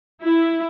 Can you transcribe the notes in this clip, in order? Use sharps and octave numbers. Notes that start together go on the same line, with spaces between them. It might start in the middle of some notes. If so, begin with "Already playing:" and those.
E4